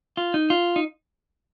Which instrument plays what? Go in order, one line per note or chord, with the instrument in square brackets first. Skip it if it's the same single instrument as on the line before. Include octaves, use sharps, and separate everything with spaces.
[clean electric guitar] F4
D#4
F4
D#4